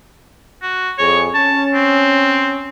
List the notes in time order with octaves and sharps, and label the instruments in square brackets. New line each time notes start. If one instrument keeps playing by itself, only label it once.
[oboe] F#4
[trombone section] F2 G#4 [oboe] C#5
[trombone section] C#4 [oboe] A5
[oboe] C4